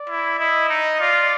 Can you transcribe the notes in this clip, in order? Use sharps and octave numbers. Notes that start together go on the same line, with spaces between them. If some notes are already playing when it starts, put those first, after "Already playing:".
Already playing: D5
E4
E4 D#5
D#4
F4 D5